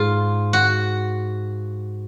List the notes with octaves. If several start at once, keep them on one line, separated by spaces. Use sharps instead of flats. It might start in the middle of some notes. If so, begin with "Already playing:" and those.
Already playing: G#2 F4
F#4